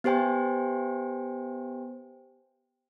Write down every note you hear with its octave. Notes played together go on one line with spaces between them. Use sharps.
B3 G4 C5 G5 G#5